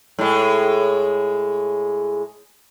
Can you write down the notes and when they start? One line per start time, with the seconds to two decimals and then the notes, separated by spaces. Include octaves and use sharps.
0.19 A2 G#3